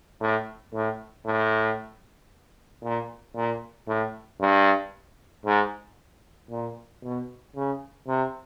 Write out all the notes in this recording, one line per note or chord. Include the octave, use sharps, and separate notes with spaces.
A2
A2
A2
A#2
A#2
A2
G2
G#2
A#2
B2
C#3
C3